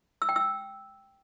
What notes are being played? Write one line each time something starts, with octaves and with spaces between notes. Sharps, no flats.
E6
G5
E6